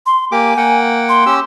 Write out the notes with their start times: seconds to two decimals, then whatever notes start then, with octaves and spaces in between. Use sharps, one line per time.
0.06 C6
0.32 A#3 G4 G#5 D6
0.57 A#3 F#5 G5
1.09 C6
1.26 C#4 G4 E6